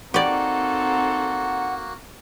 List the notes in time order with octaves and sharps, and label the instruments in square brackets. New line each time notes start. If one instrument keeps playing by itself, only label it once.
[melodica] A#3 F#4 [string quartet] C4 D#4 A4 [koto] G4 D5 [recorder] F#5